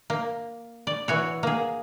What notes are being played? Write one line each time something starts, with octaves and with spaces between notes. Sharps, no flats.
A#3
D5
E3 F#4 C#5
A#3 G#4